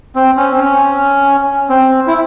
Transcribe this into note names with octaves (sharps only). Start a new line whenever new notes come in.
C4
C#4
C4
C#4
C4
E4